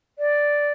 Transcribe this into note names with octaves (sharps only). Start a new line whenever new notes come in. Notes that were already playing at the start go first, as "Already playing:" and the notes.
D5